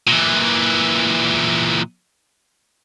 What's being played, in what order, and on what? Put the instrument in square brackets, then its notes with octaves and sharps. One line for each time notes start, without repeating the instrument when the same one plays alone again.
[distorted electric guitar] A#2 E3